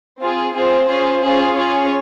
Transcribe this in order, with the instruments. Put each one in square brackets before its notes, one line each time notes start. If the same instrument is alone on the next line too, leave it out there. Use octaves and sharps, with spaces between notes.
[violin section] C4 F4 G#4
C4 F4 G#4 C5
C#4 F4 G#4
C#4 F4 G#4
C#4 F4 G#4 C#5